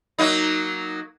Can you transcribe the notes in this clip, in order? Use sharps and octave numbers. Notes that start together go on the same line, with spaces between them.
F#3 A#3 D#4